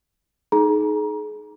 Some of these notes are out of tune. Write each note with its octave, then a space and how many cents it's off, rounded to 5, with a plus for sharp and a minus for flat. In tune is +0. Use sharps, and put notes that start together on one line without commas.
D#4 +0 G#4 +35 A#5 +25